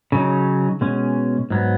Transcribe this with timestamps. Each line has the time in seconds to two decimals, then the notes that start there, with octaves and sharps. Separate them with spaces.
0.12 C#3 F#3 D#4
0.81 B2 G#3 C#4
1.50 G#2 F#3 B3